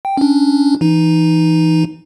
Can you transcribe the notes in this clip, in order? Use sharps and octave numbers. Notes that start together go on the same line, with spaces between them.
G5
C#4 D4
E3 D#4